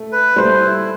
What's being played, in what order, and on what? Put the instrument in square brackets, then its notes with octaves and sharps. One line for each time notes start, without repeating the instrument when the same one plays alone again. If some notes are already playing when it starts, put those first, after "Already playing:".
Already playing: [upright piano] A3
[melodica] B4
[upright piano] G3 A3 [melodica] C5
[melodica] E4